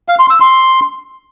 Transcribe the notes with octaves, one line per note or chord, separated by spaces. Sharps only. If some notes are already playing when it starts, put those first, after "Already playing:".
F5
C6
E6
C6